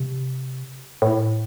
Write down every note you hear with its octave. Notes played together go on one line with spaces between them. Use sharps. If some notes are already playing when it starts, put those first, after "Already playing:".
Already playing: C3
A2